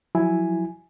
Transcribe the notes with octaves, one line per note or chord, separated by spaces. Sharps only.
F3 F#3 E4 G#5